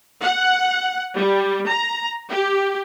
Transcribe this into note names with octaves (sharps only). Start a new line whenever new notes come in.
F#5
G3
A#5
G4